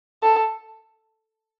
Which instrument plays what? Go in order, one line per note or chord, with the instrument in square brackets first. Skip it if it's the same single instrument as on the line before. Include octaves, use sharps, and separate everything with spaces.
[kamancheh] A4